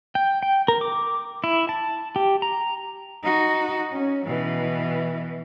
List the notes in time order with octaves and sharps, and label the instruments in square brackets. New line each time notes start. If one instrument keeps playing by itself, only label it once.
[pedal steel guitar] G5
G5
A#4
D6
E4
A5
G4
A#5
[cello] D#4 F#4
C#4
B2 E3